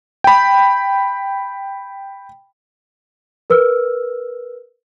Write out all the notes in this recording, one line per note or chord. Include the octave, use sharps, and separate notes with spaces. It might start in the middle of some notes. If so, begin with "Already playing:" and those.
G5 B5
A#4 B4 E6 F6